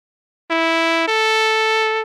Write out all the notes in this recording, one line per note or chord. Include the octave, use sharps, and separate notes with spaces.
E4
A4